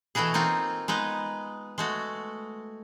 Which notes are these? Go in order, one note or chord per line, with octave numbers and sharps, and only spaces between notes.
B2 E3 A3 E4 F#4 G#4
A#3 C4 D#4 F4
G#3 B3 D#4 B4
G#3 A3 F#4